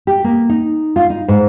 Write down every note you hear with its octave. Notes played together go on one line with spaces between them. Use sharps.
G4
A#3
D#4
F4
D#4
G#2